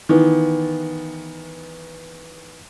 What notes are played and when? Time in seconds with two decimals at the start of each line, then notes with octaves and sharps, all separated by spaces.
0.09 D#3 E3 B3